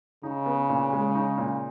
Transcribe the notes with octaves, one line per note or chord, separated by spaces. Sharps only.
C#3 D#4
B3
A#2
G#3
D#4
A#2